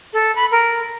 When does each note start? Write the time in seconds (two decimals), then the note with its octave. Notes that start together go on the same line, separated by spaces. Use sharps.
0.13 A4
0.36 B5
0.51 A#4